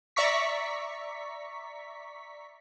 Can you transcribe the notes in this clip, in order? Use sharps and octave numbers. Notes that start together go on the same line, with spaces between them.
D5 E5 A#5 C#6 B6